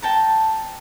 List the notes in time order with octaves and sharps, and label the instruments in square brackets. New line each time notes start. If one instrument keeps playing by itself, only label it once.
[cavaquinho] G5 A5 A#5